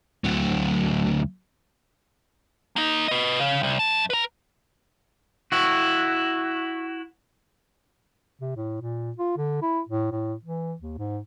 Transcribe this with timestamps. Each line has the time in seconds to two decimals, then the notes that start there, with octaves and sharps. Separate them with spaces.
0.24 D2 F#3
2.76 A#3 D#4
3.08 B4 D#5
3.39 C#3
3.63 C2
3.79 F#2 A5
4.10 B4 A#5
5.52 E4 F#4
8.41 C3
8.56 A2
8.81 A#2
9.18 F4
9.38 D3
9.62 E4
9.89 A2
10.12 A2
10.45 E3
10.81 D#2
10.98 G#2